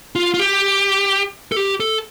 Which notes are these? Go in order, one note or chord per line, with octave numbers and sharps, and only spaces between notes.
F4
F4
G4
A4
G4
A4